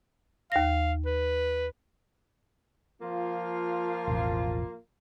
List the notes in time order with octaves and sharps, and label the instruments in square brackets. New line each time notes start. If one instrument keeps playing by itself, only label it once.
[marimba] D#2 A#6 [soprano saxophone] F5
[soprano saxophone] B4
[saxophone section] F3 A#3 F4
[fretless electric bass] E1 A1